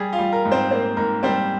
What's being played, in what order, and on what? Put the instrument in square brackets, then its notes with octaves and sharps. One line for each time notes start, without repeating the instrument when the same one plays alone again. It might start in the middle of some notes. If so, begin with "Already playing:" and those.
Already playing: [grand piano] G3 G#4
F4 F5
G3
A#4
G#2
C4 C5
A#3 C4 C5
G#2 A#4
G3 C4 C5